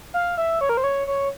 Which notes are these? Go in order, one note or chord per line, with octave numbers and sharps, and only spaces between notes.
F5
E5
C#5
A#4
C5
C#5
C#5